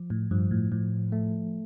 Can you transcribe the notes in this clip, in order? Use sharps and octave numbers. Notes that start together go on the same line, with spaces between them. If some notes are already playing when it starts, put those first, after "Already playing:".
Already playing: F3
A2
G2 F3
A2
A2 F3
A3